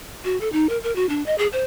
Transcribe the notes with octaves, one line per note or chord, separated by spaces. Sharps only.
F#4
A4
D#4
A#4
A#4
F#4
D4
D#5
G#4
C5